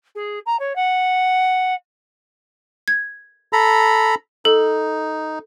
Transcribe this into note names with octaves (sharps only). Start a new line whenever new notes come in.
G#4
A#5
C#5
F#5
G#6
A4 A#5 B5
D#4 A4